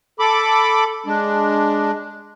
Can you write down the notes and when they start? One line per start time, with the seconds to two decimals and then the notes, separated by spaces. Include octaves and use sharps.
0.19 A4 B5 D6
1.06 G#3 D4